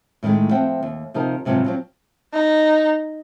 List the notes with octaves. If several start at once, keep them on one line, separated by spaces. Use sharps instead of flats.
A2 D#3 E3 G#3 A3
F3 C4 E5 F#5 G5
D#2
C3 F3 D#4 G4 A#4
G#2 C3 F3 F#3 B4 C5
F3 F#3 C4
D#4